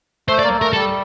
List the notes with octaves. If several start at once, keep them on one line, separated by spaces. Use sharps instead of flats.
A3 C5
D5
A#3
A3 A#4
G3 A4